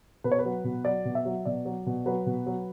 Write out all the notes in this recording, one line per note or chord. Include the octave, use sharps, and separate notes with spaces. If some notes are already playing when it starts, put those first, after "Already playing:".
B2 B4
C#5
B4
F#3
B2
F#3 D5
B2
E5
F#3
B2 D5
F#3
B2
F#3 B4
B2
F#3